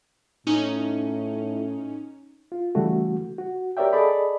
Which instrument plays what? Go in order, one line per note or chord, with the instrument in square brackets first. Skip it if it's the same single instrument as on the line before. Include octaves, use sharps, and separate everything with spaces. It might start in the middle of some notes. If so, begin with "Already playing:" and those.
[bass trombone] A2 [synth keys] C#4 D#4
[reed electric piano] F4
C#3 E3 G3 A3 F#4
F#4
G4 A#4 C#5 D5 E5 G5
G#4 A4 D5 D#5 B5